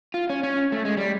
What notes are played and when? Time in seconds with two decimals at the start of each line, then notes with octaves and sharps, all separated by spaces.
0.14 F4
0.30 C#4
0.43 C#4
0.72 A3
0.85 G#3
0.97 G3